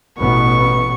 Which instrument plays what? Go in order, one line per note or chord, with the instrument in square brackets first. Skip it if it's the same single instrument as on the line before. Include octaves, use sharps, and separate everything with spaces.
[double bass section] A1 B2 B3 [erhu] C#6